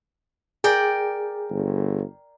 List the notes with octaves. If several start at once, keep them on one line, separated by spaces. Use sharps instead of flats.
G#4 A#4 D5 G5
G1